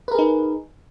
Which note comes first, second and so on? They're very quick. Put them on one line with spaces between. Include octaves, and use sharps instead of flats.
B4 A#4 G#4 D#4